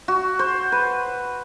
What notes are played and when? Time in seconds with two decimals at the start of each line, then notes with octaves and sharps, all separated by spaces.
0.08 F#4
0.39 C5
0.72 B4